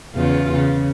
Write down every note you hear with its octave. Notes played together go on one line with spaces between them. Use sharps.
E2 C#3 F4
C#3